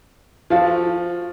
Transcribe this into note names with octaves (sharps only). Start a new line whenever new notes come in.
F3 F#4 A4 C5 F5